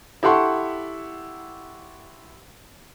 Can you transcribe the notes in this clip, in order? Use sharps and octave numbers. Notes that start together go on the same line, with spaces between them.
E4 G4 A4 F#5 C6 C#6